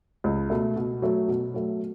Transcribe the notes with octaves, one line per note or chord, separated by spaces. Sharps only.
C#2
B2 A3
B2
F#3 A3
B2
F#3 A3